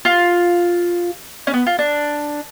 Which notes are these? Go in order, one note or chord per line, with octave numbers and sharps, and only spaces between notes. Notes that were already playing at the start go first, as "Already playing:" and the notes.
F4
C#4
B3
F4
D4